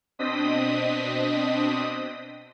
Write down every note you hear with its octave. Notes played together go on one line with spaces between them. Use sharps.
B2 C4 D4 D#5 D#6 B6